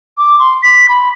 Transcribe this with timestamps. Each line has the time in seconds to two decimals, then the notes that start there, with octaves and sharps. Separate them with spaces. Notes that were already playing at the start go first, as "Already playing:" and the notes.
0.18 D6
0.39 C6
0.63 B6
0.89 B5